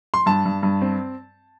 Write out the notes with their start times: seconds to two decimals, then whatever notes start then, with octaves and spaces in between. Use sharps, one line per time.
0.14 C6
0.26 G2 A5
0.45 G2
0.63 G2
0.82 C4